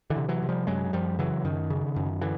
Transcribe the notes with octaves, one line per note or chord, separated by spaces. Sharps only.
D3 E3
C3
E3 F#3
C3
F3 G3
F#2 F#3 G#3
F#2 F3 G3
C#3 E3 F#3
F#2 D#3
C#3
F#2
D3 E3